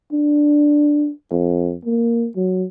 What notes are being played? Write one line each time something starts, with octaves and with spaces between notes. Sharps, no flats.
D4
F2
A#3
F#3